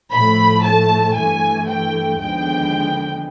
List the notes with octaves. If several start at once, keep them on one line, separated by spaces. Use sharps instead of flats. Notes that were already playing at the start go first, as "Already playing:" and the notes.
A2 F3 A3 B5
A5
G2 E3 A3 G#5
G5
D#2 D3 F3 G#3 B3 G5